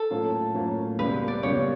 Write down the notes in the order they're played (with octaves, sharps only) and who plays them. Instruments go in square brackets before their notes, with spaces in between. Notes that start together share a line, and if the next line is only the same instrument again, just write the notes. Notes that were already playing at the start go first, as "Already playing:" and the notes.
Already playing: [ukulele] A4
[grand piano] A2 F#3 A#3 C#4 F4
A2 F#3 A#3 C#4 F4
[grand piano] C#2 B2 G3 A#3 [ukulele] B4
[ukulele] D5
[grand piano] C#2 B2 G3 A#3 [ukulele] C#5